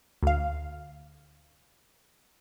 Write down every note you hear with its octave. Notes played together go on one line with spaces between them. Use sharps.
D2 F5